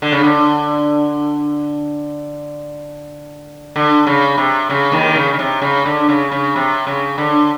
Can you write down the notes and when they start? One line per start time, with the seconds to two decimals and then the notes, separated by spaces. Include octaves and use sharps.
0.02 D3
0.12 C#3
0.23 D3
3.76 D3
4.07 C#3
4.38 C3
4.70 C#3
4.92 D#2 D#3
5.16 C#3
5.34 C#3
5.39 C3
5.62 C#3
5.86 D3
6.09 C#3
6.32 C#3
6.56 C3
6.87 C#3
7.18 D3